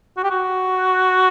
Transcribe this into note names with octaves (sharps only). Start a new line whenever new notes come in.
F#4
G4
F#4